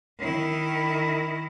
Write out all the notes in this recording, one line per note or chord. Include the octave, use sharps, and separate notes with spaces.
D#3 E4